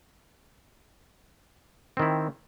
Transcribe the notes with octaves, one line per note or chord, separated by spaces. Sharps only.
D#3 C4 E4